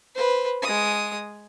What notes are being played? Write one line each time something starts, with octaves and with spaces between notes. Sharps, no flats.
B4 C5
G#3 D#6